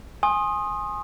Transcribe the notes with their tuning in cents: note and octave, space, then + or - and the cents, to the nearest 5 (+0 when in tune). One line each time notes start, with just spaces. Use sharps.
G#5 +0 C6 +30 D#6 +0